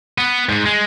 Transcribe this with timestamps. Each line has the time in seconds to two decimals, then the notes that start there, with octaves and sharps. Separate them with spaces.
0.18 B3
0.49 G#2
0.66 G#3